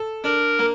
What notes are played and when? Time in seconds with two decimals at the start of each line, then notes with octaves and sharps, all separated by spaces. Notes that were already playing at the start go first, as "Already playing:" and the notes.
Already playing: A4
0.24 D4 A#4
0.59 A#3